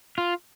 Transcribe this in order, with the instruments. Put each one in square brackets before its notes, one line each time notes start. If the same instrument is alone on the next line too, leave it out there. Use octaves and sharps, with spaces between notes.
[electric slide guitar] F4